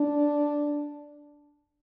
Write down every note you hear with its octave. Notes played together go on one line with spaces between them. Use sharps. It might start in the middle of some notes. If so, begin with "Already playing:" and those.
Already playing: D4